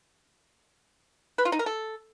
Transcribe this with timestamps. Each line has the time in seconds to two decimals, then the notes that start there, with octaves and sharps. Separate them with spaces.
1.38 B4
1.45 F4
1.52 D#4
1.59 A#4
1.66 A4